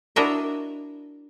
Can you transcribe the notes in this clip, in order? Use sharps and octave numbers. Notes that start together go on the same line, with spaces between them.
D4 E4 F#4 A#4 D#5 E5